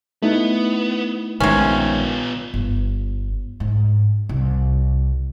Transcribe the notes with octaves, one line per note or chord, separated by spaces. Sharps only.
A3 B3 D#4 E4
A#1 C3 D#3 G#3 B3 C#4 F4
G1
G#2
C2